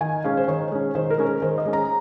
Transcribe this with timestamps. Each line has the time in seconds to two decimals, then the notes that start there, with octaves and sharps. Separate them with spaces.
0.01 D#3 G#5
0.24 G#3 C#4 F5
0.37 C5
0.48 D#3 C#5
0.72 G#3 C#4
0.95 D#3 C5
1.11 A#4
1.18 G#3 C#4
1.26 A#4
1.42 D#3 C5
1.58 D#5
1.65 G#3 C#4
1.73 A#5